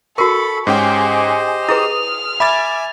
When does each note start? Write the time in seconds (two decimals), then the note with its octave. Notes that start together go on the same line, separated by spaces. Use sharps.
0.18 F#4 A4 A#4 B5 C#6
0.67 G#2 C#4 G4 G#4 C5 D#5 G5
1.69 E4 G#4 B4 D#6 F6
2.40 E5 G#5 B5 D6 A6